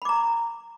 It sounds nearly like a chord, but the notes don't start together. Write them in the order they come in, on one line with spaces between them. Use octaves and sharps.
B5 D6 A#5